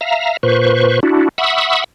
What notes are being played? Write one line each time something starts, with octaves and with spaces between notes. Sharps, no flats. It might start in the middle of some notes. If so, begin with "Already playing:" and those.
E5 F5 A#5
A#2 B4 C5 C#6
D4 E4 F#4
E5 F#5 B5 C#6 D#6 E6